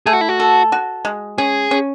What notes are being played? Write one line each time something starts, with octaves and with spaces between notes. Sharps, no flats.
A3 G#4
F#4
E4
F#4
A4
F#4
G#3
C#4 G#4
C#4